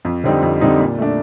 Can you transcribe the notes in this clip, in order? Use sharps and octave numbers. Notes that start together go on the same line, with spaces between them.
F2
D3 G3 C4 D#4
F2
D3 G3 C4 D#4
A#2
A3 D4